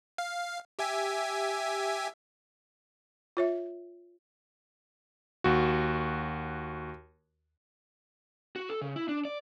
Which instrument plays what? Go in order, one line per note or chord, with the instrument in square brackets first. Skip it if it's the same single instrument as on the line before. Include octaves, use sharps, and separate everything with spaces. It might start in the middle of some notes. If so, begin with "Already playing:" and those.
[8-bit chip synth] F5
G4 E5 G#5
[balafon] F4 C#5 E5
[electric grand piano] D#2 F#4
[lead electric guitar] F#4
A4
C#3
E4
D4
D5